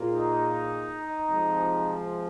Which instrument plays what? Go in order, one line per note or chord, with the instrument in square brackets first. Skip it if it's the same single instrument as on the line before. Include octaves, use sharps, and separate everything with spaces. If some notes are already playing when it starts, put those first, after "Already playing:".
Already playing: [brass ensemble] A#2 A#3 F4 G#4
[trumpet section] D#4
[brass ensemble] C3 F3 G#3